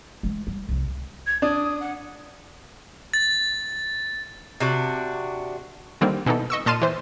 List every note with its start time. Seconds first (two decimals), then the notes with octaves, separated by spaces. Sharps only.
0.23 E3 G#3
0.47 G3
0.69 C2 F2
1.27 G#6
1.42 D4 D#6
1.80 F#5
3.14 A6
4.60 C3 D4 F#4
6.01 D3 D#3 G3 A#3 C4
6.26 B2 E3 B3 D#4 A4
6.50 D#5 C#6 E6
6.66 A#2 D#5 A5 C6 F6 D#7
6.82 E3 C5